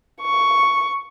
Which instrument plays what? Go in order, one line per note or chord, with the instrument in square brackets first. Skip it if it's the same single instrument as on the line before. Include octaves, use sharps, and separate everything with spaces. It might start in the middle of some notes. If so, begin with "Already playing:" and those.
[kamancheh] C#6